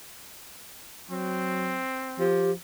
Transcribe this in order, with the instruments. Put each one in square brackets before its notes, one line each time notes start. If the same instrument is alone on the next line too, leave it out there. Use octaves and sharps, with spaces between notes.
[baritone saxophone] F#3 [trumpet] C4
[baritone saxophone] F3 [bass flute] G4